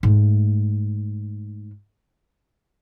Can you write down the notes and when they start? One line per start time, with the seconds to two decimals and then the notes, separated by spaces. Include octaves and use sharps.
0.03 G#2 A3